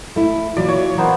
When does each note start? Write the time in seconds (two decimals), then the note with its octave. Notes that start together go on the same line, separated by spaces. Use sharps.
0.16 A3 E4
0.57 A#2 E3 F#3 D5
0.68 C#5
0.98 A#3 B3 C5